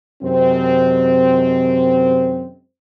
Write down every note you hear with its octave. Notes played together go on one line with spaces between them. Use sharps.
F#2 C3 D#3 G#3 C4